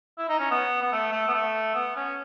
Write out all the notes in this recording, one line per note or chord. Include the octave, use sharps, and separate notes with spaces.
E4
D#4
C#4
B3
B3
A3
A3
B3
A3
B3
C#4